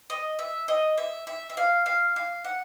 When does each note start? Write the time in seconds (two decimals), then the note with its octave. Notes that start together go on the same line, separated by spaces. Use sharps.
0.10 D#5
0.39 E5
0.68 D#5
0.98 E5
1.27 E5
1.50 E5
1.57 F5
1.86 F5
2.16 F5
2.44 F#5